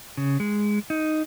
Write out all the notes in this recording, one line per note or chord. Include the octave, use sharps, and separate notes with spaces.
C#3
G#3
D#4